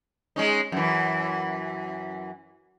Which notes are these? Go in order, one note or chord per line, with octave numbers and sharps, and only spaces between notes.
G#3 C#4 D#4
F#2 E3